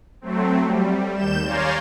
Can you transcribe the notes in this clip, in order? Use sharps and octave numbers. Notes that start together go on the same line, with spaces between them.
F#3 A3 C4
G3
D#2 G6 E7
C#5 D5 F5 G#5 A#5 C6